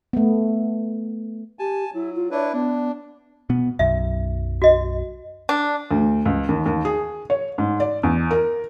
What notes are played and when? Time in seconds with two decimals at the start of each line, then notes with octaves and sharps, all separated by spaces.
0.13 A3 B3
1.59 G4 G#5 A5
1.94 F#3 E4
2.15 F4
2.31 D4 E4 B4 C#5
2.53 B3 D4
3.50 B2 B3
3.79 B1 F#2 E5
4.62 F#4 D#5
5.49 D4
5.91 D2
6.26 C#2
6.49 D#2
6.66 D#2
6.85 G#4
7.30 C#5
7.58 G#2
7.80 D5
8.03 E2
8.31 A#4